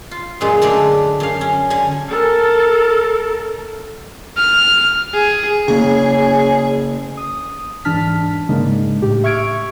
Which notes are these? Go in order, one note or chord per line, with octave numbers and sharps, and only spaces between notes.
F4
F#2 A#2 G#3 F4
D3 A3 D4 D5
F#2 F5
C#4
D3 G#5
A4 A#4
F6
G#4
C#3 A#3 C#4 G#4
D#6
G#2 E3 D4 A5 F6 B6
G#2 C#3 G#3 A#3 D4 D#4
A2 G4
E5 C#6 F6 G#6 D7